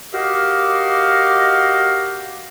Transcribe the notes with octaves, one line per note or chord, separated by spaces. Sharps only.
F#4 G4 A#4 D#5 F5 D6